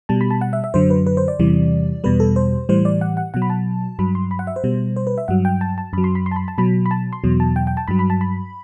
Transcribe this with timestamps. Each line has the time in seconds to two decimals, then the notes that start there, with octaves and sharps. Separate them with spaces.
0.09 B2 G3 A5
0.21 B5
0.31 A5
0.41 F#5
0.53 E5
0.64 E5
0.74 F#2 D3 F#3 C5
0.90 B4
1.07 B4
1.17 C5
1.28 D5
1.39 E2 C3 E3 G3
2.04 E2 B2 G3 B4
2.20 A4
2.36 C5
2.69 A2 E3 G3 C5
2.85 D5
3.01 F#5
3.17 F#5
3.34 B2 F#3 F#5
3.42 B5
3.50 A5
3.99 G2 F#3 B5
4.15 C6
4.31 B5
4.39 F#5
4.47 E5
4.56 C5
4.64 B2 G3
4.96 C5
5.07 B4
5.18 E5
5.28 G2 F#3 F#5
5.45 G5
5.61 A5
5.78 A5
5.93 F#2 F#3 B5
6.04 C6
6.15 B5
6.26 C6
6.31 A5
6.36 B5
6.48 A5
6.58 B2 F#3 B5
6.86 B5
6.91 A5
7.13 C6
7.24 E2 B2 F#3
7.40 A5
7.56 G5
7.67 G5
7.77 A5
7.88 G2 F#3 B5
7.99 B5
8.10 A5
8.21 B5